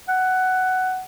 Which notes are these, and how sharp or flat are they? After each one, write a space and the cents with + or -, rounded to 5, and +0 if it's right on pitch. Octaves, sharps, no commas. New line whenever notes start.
F#5 +10